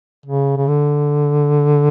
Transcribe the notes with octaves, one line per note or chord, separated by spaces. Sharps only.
C#3
C#3
D3